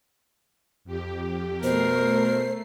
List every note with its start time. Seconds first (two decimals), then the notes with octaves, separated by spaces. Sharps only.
0.85 F2 G4
1.63 B2 A3 A#4 C5 C7